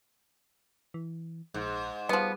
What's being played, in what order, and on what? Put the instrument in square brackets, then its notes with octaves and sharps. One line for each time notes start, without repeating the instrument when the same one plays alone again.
[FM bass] E3
[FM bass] A#1 [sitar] G#2
[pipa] F3 B3 [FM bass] G3